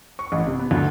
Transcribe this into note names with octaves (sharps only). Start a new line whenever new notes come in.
C#6
A1
C3
B3
D2